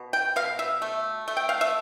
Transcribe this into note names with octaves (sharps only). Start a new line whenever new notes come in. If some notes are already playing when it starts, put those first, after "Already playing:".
Already playing: B2
G5
B2 F5
E5
A3
A3
G5
F5
E5